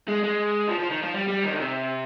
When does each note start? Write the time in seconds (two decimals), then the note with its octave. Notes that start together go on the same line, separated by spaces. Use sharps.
0.09 G#3
0.24 G#3
0.69 F3
0.80 F3
0.90 D#3
1.03 F3
1.14 G3
1.28 G3
1.44 D#3
1.52 D3
1.58 C3